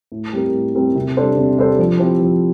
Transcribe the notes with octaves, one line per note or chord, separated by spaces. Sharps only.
A2
G3 C4 G4 A#4
A2
G3 C4 G4 A#4
C3
G3 D4 A4 C5
C3
G3 D4 A4 C5
F3
C4 E4 G4 C5
F3